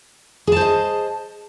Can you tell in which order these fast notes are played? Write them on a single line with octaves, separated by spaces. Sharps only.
G#4 A5 C5 D#5